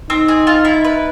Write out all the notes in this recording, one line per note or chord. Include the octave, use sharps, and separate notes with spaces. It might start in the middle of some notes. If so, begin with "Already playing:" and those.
C4 D#4
G#4
F4
E4
B4